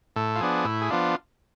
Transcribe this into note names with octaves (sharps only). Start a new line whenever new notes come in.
A2 A4
F4
F3 B3 D4 G#4
A2 E4
G#4
F3 B3 D4 F4